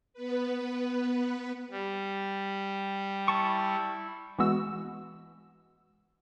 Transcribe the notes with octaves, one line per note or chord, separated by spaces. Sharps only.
B3 B4
G3
E4 A5 C#6
E3 G#3 B3 F#4 E6